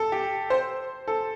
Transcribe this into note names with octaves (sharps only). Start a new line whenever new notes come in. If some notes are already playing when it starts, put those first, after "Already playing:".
Already playing: A4
G4
C5
A4